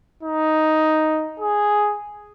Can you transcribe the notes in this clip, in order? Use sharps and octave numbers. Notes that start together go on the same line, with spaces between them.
D#4
G#4